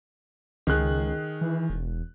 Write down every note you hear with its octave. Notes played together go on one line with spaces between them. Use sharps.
C#2 D#3 G#4 F#6
E3
E1